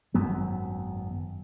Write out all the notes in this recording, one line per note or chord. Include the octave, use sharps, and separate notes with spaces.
G#1 F#2 F#3 B3